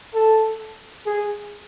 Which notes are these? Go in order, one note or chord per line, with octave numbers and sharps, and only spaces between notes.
A4
G#4